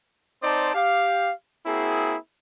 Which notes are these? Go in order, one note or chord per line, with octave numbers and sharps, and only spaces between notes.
C4 D#4 C5 D5 A5 D6
G4 F5
A#3 C4 E4 F#4 G#4